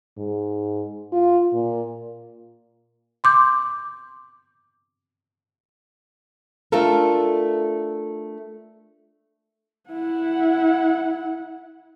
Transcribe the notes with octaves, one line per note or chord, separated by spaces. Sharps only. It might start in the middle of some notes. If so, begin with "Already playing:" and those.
G#2
F4
A#2
C6 D6 G6
A3 D4 F4 A4 A#4
E4 F#5